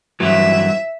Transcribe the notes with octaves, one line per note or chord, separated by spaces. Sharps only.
G2 E3 F#3 E5